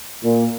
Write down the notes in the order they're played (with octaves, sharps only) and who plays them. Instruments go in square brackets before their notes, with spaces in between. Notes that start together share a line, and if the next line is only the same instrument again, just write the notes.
[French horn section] A#2